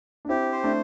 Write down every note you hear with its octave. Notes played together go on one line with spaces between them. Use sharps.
D4
C4 E4 G4
C5
A3 D4